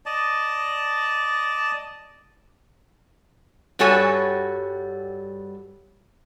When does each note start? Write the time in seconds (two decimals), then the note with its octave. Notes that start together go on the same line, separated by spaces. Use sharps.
0.06 D5 D#5 A5
3.79 G2 G3 F#4 A4 C#5 G#5